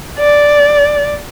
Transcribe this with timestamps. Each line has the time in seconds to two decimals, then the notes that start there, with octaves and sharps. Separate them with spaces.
0.19 D5